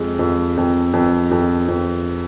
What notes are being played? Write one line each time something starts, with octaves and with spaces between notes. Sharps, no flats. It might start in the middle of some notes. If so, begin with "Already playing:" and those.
Already playing: F2 G#3
F2
F2
F2
F2
F2